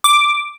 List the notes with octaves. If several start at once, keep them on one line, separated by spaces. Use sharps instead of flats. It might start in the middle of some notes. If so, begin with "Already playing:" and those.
D6